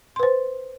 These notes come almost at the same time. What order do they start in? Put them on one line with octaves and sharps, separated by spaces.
C6 B4 C5